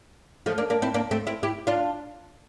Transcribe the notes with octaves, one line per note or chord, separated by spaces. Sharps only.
F3 A3
A#3 D4
A#3 D4
C4 E4
A#3 D4
A3 C4
C4 E4
E4 G4
D4 F4